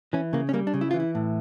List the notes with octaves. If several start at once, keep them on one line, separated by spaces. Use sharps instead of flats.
E3 C#4
C#3 A#3
C#4
G3 A#3
D4
C#3
E4
E3 F4
E4
A2